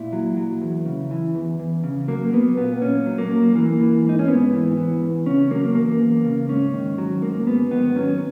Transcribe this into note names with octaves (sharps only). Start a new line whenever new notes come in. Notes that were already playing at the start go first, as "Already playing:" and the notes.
Already playing: A#2 E4
F#3
F#3
E2
C#3
E3
E2
E2
C#3
F#3 A#3
F#3 B3
A#2 B3
A#2 C#4
F#3
A#3
F#3
E3 A#3
E3
G#2 D#4
C#4
G#2 B3
E3
E3
E2
C#3 C#4
F#3 A#3
E2 A#3
E2
C#3
G#2 C#4
D#3
F#3
G#2 A#3
G#2 B3
D#3 B3
F#3 C#4